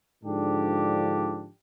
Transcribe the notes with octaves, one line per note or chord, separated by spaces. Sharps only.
G#2 D3 F3 D4 G4